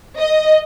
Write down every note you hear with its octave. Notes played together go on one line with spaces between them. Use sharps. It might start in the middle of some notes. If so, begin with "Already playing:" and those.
D#5